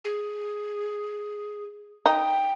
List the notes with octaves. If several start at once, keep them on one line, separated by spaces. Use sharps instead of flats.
G#4
D#4 G5